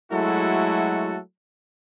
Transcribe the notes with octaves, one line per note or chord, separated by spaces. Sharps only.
F#3 G#3 A3 E4 F#4 A4